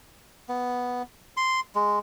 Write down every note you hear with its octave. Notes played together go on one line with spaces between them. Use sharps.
B3
C6
G#3